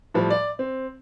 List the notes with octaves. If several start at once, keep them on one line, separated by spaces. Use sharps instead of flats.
A2 F3 G3
D5
C4